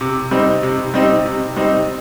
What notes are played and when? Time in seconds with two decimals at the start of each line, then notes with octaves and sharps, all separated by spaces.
0.01 C3
0.31 G3 C4 D#4
0.63 C3
0.94 G3 C4 D#4
1.26 C3
1.56 G3 C4 D#4